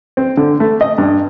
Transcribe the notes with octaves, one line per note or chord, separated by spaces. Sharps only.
C4
D3
A3
D#5
G2